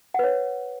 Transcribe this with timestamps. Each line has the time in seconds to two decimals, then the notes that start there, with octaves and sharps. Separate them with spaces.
0.14 F#5
0.19 B4
0.24 C#5